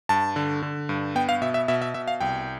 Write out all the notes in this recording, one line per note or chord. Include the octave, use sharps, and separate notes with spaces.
G2 A5
D3
D3
G2
B3 G5
F5
B2 E5
E5
B2 E5
E5
B2 E5
F5
C2 G5